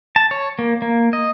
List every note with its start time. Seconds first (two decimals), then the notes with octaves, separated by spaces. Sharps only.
0.16 A5
0.31 C#5
0.59 A#3
0.82 A#3
1.13 D#5